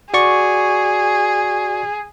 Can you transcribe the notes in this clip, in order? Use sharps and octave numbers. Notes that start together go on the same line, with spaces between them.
F#4 G#4 D5 C#6